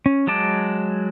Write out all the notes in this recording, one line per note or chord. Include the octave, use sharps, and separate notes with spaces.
C#4
F#3 G#3 A5 D6